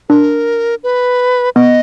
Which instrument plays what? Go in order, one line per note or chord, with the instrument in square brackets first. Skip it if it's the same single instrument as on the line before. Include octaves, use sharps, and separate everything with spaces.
[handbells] D4 [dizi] A#4
[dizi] B4
[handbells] B3 [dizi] D#5